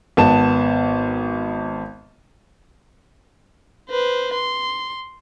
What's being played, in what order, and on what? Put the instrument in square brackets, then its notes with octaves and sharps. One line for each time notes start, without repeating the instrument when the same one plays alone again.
[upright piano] G#1 B3 A5 E7
[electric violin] B4 C5
C6